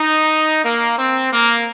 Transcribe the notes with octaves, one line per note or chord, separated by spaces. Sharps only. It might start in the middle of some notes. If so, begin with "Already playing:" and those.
Already playing: D#4
A#3
C4
A#3